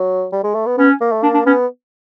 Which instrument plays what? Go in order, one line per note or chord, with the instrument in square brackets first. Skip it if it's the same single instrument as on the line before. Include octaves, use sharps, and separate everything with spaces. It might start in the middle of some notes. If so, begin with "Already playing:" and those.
Already playing: [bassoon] F#3
G3
G#3
A3
B3
[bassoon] B3 [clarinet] C#4
[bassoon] A#3
A3
[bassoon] A#3 [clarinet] D4
[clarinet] D4
[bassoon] B3 [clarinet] C#4